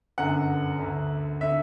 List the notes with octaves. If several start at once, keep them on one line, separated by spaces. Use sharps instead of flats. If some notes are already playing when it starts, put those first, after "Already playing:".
G1 F#2 D3 F#5
D2 D3
D3 E5